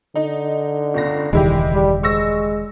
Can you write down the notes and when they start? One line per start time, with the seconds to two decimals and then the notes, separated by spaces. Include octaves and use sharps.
0.16 D3 D#4
0.94 G1 C#2 A#6
1.33 E1 C#2 D#3 G3 G#3 E4 G4
1.74 G3
2.03 G#3 C#6 E6 A#6